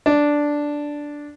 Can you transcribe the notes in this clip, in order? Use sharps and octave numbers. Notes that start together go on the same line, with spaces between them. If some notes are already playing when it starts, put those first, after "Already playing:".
D4